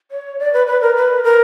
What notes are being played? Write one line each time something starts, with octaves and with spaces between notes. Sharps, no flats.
C#5
D5
B4
B4
A#4
B4
A#4